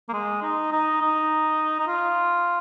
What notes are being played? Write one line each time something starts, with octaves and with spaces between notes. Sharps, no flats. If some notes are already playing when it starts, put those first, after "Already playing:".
A#3
G#3
D#4
D#4
D#4
D#4
F4